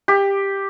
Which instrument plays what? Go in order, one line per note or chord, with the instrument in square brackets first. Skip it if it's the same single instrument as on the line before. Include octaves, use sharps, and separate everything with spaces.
[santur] G4